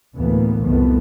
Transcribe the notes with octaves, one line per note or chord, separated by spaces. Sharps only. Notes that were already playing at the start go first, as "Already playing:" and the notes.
D2 A2 E3 A#3 B3
C2 F2 C3 D#3 A3 B3